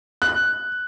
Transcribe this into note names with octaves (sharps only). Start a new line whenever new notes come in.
F#6